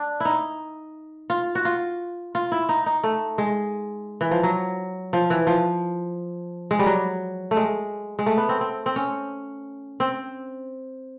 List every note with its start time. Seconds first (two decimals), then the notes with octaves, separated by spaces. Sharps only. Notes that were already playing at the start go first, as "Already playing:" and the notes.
Already playing: D4
0.20 D#4 E4
1.30 F4
1.55 F#4
1.65 F4
2.35 F4
2.52 E4
2.69 D#4
2.86 D#4
3.04 A3
3.38 G#3
4.21 E3
4.31 F3
4.43 F#3
5.13 F3
5.30 E3
5.47 F3
6.71 G#3
6.79 G3
6.86 F#3
7.51 A3
7.57 G#3
8.19 G#3
8.26 A3
8.37 B3
8.49 C4
8.61 C4
8.86 C4
8.96 C#4
10.00 C4